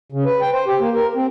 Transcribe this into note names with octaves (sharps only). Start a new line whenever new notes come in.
C#3
B4
G5
C5
G4
A#3
A#4
C4